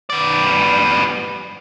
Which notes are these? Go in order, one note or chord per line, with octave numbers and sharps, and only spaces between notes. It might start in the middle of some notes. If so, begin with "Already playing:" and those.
B3 D5